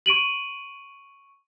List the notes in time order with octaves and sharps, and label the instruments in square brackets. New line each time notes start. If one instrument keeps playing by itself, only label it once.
[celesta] C#6 D7 D#7 F#7